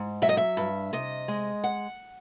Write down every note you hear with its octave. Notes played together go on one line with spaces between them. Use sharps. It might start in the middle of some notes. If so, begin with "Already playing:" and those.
Already playing: G#2
F#3 E5
D#5
E5
G2
C3 D#5
G#3
F#5